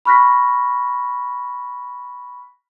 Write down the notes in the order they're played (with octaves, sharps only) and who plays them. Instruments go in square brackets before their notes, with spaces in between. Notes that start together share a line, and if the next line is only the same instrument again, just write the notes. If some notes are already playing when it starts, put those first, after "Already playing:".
[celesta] B5 C#6 F6 F#6 A#6 B6